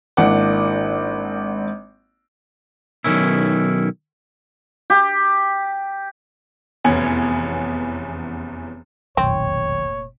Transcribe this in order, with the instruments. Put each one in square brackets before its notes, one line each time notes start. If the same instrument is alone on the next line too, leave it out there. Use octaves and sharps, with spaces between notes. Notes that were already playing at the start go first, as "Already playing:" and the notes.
[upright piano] G#1 A#3 D4 E4 F#5 D6
[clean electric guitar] B1 F#2 D#3 C#4 E4
[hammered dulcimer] G4
[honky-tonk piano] F1 E2 B3 C#4 G#5 G#6
[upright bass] F1 A#2 [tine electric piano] B1 E2 D#3 [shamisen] C4 [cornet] C#5